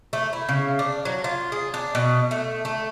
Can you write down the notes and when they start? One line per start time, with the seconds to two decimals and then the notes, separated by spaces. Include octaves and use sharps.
0.13 A3
0.33 E4
0.49 C#3
0.79 D4
1.05 F#3
1.24 F4
1.52 G#4
1.74 D4
1.95 B2
2.31 A3
2.65 A3